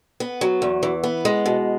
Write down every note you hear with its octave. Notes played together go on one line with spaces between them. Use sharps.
B3
F#3
E2
E3
B3
G#3
B2